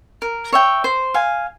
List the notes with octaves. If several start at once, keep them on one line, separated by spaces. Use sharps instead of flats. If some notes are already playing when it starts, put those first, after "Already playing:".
A#4
C#5 E5 G5
C5
F5 G#5